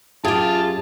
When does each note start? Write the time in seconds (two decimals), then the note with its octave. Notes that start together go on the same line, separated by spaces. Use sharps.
0.25 F#2 F4 G4 G#4 A5